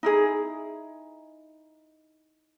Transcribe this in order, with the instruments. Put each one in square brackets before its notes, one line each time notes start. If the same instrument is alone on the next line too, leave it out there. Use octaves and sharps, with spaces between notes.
[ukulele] D#4 E4 G#4